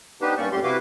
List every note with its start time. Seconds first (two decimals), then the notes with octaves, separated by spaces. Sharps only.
0.21 B3 D4 D#4 G4 B4 C5
0.38 G2 A#3 C#4 D5 C#6
0.52 F#2 A2 G3 G4 C6
0.64 C3 E4 F#4 B4 F5 D6